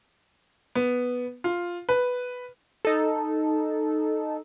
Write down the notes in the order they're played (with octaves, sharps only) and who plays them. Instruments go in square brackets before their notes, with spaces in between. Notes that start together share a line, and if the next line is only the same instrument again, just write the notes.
[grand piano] B3
F4
B4
[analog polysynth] D#4 A4